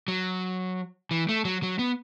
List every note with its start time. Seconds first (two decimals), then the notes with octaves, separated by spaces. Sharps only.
0.08 F#3
1.11 E3
1.29 A3
1.45 F#3
1.63 F#3
1.79 B3